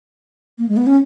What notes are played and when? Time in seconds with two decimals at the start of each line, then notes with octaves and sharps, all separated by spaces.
0.59 A#3
0.69 G#3
0.77 B3
0.87 C#4